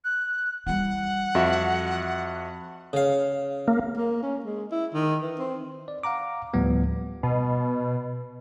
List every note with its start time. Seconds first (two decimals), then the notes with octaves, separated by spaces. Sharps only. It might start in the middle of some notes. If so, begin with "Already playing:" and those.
0.05 F#6
0.67 E3 G3 F#5
1.35 F2 F#4 E5
2.93 C#3 F5
3.68 A#3
3.97 A#3
4.22 C#4
4.44 G#3
4.72 E4
4.94 D#3
5.22 E3
5.38 C4
5.88 D5
6.03 F5 F#5 A#5 D6
6.54 D2 A2 F3 G3 B3
7.23 B2